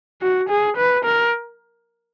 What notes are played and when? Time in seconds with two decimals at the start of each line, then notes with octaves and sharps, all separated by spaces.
0.22 F#4
0.49 G#4
0.77 B4
1.05 A#4